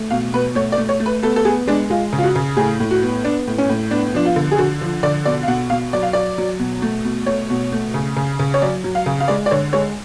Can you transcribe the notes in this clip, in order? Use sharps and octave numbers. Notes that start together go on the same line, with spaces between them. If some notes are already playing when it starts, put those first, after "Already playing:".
Already playing: A3
B2 F5
B2 B4
A3 C#5
D5
A3
C#5
A3
B4
B3 A4
A4
B3 G#4
G#3 D4
G#3 F4
C#3
F4
F#4
C#3
A2 G#4
A2
F#4
B3
B3 D4
A2
C#4
A2
B3 D4
F3 D4
F4
D3
G#4
D3 F#4
F3
D3 D5
B2 D5
F5
B2 F#5
B2 F5
F#3 D5
F5
F#3 D5
F#3
B2
A3
B2
A3 C#5
B2
A3
C#3
C#3
C#3
C#5
F#3 D5
F#3
F5
C#3
F5
G#3 D5
D5
D3 C#5
G#3 C#5